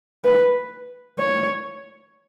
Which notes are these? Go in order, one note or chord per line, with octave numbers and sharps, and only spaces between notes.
B4
C#5